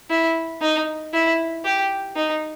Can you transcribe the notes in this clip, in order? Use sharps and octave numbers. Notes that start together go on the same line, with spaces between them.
E4
D#4
E4
G4
D#4